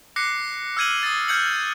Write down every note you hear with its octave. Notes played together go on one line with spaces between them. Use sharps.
D6 F#6 A#6 C7 C#7
E6 F6 G#6 D#7 F#7
D#6 A6
F6 G6 G#6 C#7 F#7